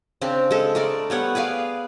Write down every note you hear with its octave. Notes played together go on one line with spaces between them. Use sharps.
C#3 C4 D4
G#3 A4
A3 A#4 D5
G3 B3 C#5 F#5
G#4 B4 D5 F5